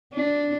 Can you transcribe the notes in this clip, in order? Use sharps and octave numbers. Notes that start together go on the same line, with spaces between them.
D4